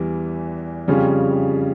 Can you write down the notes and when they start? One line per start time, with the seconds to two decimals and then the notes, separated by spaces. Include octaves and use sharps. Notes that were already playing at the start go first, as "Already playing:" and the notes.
Already playing: E2 E3 G3
0.88 F2 C#3 G3 C#4 F4